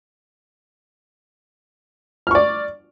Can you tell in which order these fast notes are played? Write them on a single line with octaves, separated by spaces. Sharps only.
F6 C#6 D5